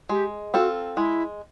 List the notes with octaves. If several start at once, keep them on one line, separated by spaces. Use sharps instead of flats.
G#3 G4
C4 F4 F#4 A4
G#3 E4